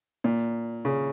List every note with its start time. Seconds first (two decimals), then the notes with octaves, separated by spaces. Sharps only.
0.24 A#2
0.85 C#3